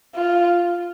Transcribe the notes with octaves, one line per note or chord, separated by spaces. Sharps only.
F4